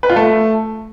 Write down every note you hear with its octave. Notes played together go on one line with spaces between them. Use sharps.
B4
F4
A3